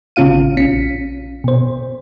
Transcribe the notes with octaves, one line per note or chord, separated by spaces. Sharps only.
A1 C#3 C#4 F4 F5 D#7
A#1 C#4 B6 C#7
B2 C5